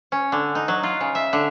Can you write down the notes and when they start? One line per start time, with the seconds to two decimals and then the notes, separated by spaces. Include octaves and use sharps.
0.12 C#4
0.32 D3
0.55 D#4
0.68 F#3
0.83 F4
1.01 C#3
1.15 E5
1.33 D3